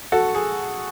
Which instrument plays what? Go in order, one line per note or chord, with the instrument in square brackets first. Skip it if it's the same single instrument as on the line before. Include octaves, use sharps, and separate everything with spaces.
[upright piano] F#4 A4
G#4